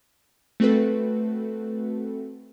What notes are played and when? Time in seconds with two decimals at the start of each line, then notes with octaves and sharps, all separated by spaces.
0.60 A3 C4 F#4 A4 B4